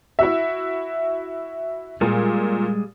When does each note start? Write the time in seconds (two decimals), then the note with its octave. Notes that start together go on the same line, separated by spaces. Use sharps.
0.19 E4 F#4 E5
2.01 A#2 G3 G#3